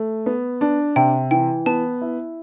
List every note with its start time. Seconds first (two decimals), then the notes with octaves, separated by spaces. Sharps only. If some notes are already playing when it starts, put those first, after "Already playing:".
Already playing: A3
0.26 B3
0.61 D4
0.96 C3 G5
1.31 E3 G5
1.66 B3 A5
2.01 E4